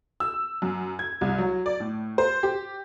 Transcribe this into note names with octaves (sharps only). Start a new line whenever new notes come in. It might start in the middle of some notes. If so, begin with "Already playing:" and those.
E6
F#2
G#6
C2
F#3
D5
A2
C5
G4